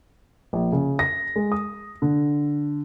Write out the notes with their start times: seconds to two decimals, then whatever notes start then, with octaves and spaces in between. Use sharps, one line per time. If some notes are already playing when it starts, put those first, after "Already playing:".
0.53 A#1
0.72 C#3
0.99 A#6
1.36 G#3
1.52 D#6
2.02 D3